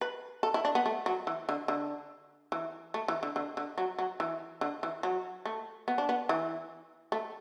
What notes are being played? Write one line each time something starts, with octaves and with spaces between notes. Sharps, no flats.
B4
A4
E4
D4
B3
A3
F#3
E3
D3
D3
E3
A3
E3
D3
D3
D3
F#3
F#3
E3
D3
E3
F#3
A3
B3
D4
B3
E3
A3